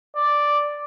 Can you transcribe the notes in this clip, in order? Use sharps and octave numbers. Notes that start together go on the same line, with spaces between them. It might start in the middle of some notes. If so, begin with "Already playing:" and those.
D5